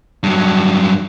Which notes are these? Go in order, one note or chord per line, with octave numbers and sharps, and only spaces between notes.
G2 F#3